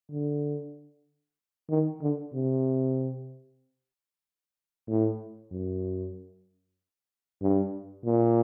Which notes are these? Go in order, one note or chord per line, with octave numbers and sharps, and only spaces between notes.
D3
D#3
D3
C3
A2
F#2
G2
A#2